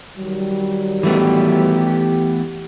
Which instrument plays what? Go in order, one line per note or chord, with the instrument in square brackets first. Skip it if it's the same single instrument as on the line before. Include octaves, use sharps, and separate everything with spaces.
[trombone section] D#3 F#3 G3
[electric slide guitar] E3 A3 B3 [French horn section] G4